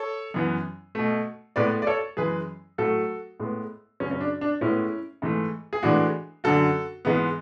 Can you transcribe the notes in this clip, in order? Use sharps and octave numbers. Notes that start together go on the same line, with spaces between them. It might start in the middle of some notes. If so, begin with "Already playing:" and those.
Already playing: A4 C#5
F#2 E3 B3
B2 A3
A2 G#3 B3 B4 D5
D5
A4 C#5
F#2 E3 G#3 G#4 B4
A2 F#3 A3 F#4 A4
A2 G#3 B3
F#2 C#3 F#3 C#4
C#4
D4
D4
A2 G#3 B3 C#4 E4
G#2 E3 A3
G#4
A2 E3 G#3 D4 F#4
F#2 D3 F#3 F#4 A4
G#2 E3 G#3 B3